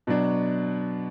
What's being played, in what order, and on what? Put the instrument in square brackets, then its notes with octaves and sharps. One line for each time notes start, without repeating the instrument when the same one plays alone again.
[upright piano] B2 F#3 D4